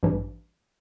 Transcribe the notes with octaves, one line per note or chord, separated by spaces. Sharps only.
A1 G2 E3